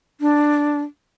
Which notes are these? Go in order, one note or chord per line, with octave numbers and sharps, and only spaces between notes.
D4